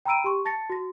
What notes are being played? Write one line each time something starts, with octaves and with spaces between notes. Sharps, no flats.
G5 A#5 B5 E6 D7 D#7
G4 C6 C#6
A5 A6 A#6 C#7
F#4 A#6